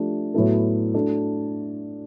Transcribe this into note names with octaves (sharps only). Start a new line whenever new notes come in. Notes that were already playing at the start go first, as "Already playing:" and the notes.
Already playing: F3 A3 D4 G4
A2 F#3 B3 E4 A4
A3 D4 F#4 A4